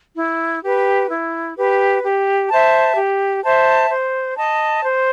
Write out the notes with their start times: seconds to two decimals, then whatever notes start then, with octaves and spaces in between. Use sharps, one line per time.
0.15 E4
0.62 G4 B4
1.10 E4
1.56 G4 B4
2.03 G4
2.50 C5 E5 A5
2.96 G4
3.43 C5 E5 A5
3.90 C5
4.37 D#5 A5
4.83 C5